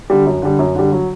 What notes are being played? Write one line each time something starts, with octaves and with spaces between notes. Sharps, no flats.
D3 G3
F#2
D3 G3
F#2
D3 G3
F#3